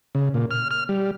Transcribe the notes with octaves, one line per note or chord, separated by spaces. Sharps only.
C#3
A#2
F6
F6
G3